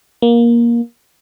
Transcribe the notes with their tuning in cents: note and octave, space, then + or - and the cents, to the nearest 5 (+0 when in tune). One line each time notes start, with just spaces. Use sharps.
A#3 +15